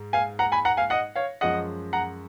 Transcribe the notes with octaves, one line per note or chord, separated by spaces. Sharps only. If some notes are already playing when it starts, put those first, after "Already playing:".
Already playing: G#2 G#3
F5 G#5
F#5 A#5
G#5 B5
F#5 A#5
F5 G#5
D#5 F#5
C#5 F5
F#2 F3 G#3 D#5 F#5
F#5 A#5